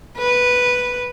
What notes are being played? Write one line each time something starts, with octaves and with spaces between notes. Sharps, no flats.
B4